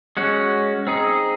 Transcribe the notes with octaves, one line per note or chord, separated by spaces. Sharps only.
G#3 C#4 F#4
C4 D#4 G#4